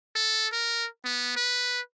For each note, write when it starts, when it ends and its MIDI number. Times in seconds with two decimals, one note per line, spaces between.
0.16 0.48 69
0.53 0.87 70
1.05 1.34 59
1.36 1.80 71